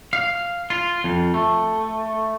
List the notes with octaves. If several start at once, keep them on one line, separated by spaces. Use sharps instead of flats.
F5
F4
F2
A3